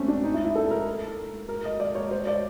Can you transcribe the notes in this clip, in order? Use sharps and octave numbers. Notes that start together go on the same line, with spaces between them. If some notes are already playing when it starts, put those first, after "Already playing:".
Already playing: A3 C4 C#4
D4
D#4
E4
E4
A4
A#4
A#4
D#5
D5
C#5
C5
D5